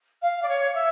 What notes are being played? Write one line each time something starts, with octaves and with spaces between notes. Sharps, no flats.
F5
D5
C#5
E5